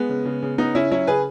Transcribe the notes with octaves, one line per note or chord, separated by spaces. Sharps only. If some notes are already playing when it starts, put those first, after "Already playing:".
Already playing: G#3 B3
C#3
C#3
C#3
C#3 B3 D#4
C#3 C#4 E4
F#3 C#4 E4
C#3 G#4 B4